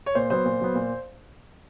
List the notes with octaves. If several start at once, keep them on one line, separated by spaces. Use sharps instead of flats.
C#5
A#2 C5
F#3 B3 C5
A#2
F#3 B3
A#2